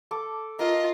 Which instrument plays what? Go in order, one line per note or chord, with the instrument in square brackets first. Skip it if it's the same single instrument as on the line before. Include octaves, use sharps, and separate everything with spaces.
[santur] A4 D6
[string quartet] F4 [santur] A#4 [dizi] D#5